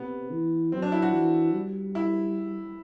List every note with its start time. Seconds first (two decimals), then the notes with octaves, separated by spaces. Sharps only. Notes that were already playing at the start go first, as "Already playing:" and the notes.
Already playing: C3 B3
0.31 E3
0.72 F#3 C4
0.82 D4
0.92 E4
1.02 F#4
1.13 E3
1.53 G3
1.95 E4